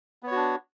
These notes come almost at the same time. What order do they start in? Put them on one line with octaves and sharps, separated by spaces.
B3 C#5 F#4 D4